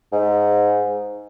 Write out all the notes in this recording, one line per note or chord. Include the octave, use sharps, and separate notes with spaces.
G#2